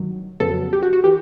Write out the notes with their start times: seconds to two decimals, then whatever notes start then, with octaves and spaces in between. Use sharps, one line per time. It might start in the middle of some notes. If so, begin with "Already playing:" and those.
Already playing: G1 G2 D#3 F#3
0.40 F2 C#3 F#3 B3 A4
0.73 G4
0.83 F#4
0.93 F#4
1.04 E3 G4